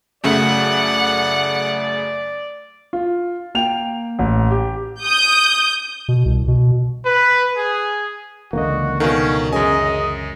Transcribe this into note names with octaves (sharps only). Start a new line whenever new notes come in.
F#2 C#3 A3 D5 F#5
F4
A#3 G5 F7
A1
G4
D#6 G6
B2
C2
B2
B4
G#4
C#2 D3 E3 A#3 F#4 D#5
B2 D#3 C#4 A4 A#4 F5
F#2 C#4 G#4 D#5 G#5